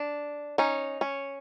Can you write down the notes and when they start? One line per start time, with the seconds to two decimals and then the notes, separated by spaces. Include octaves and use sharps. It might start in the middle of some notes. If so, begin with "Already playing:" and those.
Already playing: D4
0.58 C#4 D#4
1.01 C#4